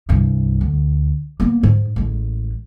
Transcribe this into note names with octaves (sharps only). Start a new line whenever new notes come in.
C2 G2
D2
A#3 B3
G#2
A1 G#3